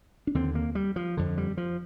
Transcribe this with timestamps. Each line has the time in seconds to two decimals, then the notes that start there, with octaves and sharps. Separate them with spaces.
0.27 D4
0.35 D#2 D3 C4
0.55 A#3
0.75 G3
0.96 F3
1.17 F2 D3
1.38 G3
1.57 F3